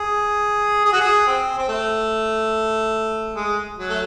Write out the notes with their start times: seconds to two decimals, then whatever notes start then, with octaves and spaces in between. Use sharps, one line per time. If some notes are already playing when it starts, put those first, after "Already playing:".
Already playing: G#4
0.85 G#4
0.93 F#4
1.01 G#4
1.27 C4
1.58 C4
1.68 A3
3.36 G#3
3.77 F#3
3.89 A3